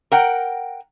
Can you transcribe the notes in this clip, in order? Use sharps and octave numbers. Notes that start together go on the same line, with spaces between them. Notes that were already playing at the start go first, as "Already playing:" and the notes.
A#4 F#5 G5